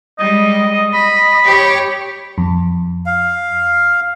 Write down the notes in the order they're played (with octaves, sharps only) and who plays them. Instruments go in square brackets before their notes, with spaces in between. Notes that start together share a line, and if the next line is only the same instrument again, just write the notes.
[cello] G3 G#3 [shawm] D#5
[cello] D#5 [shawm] B5
[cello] G4 C#5
[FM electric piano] F2
[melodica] F5